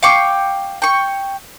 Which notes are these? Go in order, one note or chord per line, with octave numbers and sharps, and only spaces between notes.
F5 G5 C#6 D6
G5 C#6